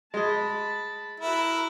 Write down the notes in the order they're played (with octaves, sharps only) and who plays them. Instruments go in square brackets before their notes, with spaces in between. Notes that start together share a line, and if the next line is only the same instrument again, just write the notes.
[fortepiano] G#3 D#5 [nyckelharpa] A5 B5
[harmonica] E4 [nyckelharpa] F#4 A#4